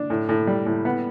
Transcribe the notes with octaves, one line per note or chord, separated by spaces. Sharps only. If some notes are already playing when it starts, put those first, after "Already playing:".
Already playing: D4
A2
A2
G3
A2
B3